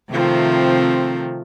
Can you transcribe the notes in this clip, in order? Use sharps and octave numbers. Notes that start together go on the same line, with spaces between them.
C3 D#3 F3 A3 C4